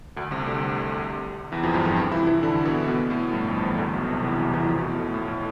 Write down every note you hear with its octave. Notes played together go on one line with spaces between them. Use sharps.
D2 D3
C2 C3
D2 D3
E2 E3
F2 F3
G2 G3
F2 F3
C3 C4
E3 E4
E3 E4
D3 D4
B2 B3
B2 B3
A2 A3
G2 G3
F2 F3
E2 E3
D2 D3
B1 B2
C2 C3
E2 E3
E2 E3
E2 E3
F2 F3
B2
A2
A2
A2
A2